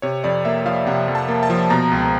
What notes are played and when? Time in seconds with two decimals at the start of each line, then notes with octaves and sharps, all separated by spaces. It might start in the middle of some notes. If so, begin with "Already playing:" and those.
0.02 C3 C#5
0.24 F2 D5
0.45 A#3 E5
0.66 F3 F5
0.87 C3 F#5
1.08 F2
1.15 A5
1.29 A#3
1.43 A5
1.50 F3
1.70 B2 A#5
1.92 C#2